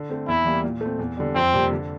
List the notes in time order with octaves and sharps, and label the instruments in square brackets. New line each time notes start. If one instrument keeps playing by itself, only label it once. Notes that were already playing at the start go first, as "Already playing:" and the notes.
Already playing: [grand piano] D3
A3 C4
[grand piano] E2 [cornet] E4
[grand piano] E3 G3 A#3
A#2
A3 C4
E2
D3 G3
[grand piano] F2 [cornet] C4
[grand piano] C3 G3 A#3
D3